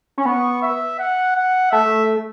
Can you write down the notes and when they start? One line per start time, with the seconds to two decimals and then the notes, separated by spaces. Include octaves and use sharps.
0.18 C#4
0.25 B3 C#6
0.62 E5
0.99 F#5
1.36 F#5
1.71 A3 E5